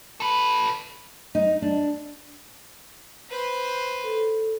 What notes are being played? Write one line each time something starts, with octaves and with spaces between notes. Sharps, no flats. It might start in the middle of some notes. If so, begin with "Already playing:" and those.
A4 B4
D#4
D4
B4 C5
A4